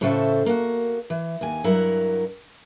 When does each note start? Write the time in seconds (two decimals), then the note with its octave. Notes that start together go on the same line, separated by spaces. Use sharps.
0.01 A2 C#3 F#4 A4 C5 E5
0.46 A#3 F#4
1.10 E3
1.41 D#2 G#5
1.64 G2 F#3 E4 A#4 F#5